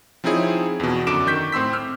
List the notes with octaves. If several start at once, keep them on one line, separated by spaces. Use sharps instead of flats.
F3 C4 D#4 E4 G#4 C#5
E2 B2
F#2 D3 D6 D7 E7
D#3 C#6 G6 B6
A2 C4 C6 E6 B6
E6 F6 G6